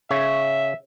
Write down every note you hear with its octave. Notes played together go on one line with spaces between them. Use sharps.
C#3 C#5 E5